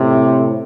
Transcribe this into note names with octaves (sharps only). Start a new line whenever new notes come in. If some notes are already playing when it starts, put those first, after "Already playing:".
Already playing: A2 C3